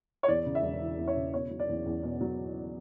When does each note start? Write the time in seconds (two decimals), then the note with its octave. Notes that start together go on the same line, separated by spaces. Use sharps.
0.23 C#5
0.28 E2 D5
0.46 C#3
0.55 E5
0.63 E1
0.81 E3
0.98 E2
1.08 C#5
1.16 C#3
1.33 B2 C#5
1.51 F#3
1.59 D5
1.69 E2
1.86 E2
2.03 B2
2.21 F#3